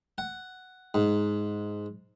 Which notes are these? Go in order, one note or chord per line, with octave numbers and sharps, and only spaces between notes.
F#5
G#2